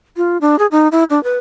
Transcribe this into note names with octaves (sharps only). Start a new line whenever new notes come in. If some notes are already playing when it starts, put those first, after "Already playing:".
F4
D4
G#4
D#4
E4
D4
B4